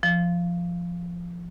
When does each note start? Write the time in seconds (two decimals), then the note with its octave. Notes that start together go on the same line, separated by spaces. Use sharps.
0.03 F3